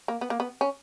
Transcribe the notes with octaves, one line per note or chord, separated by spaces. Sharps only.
A#3
B3
A#3
B3
C#4